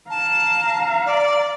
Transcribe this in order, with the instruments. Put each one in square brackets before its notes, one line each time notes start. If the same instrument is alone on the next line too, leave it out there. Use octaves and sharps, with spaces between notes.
[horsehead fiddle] F5 A#5 [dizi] A5
[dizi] D5